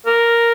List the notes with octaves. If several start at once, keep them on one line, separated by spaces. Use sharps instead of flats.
A#4